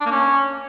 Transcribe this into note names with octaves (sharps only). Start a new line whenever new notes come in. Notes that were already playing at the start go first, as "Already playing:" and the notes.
D4
A#3
C#4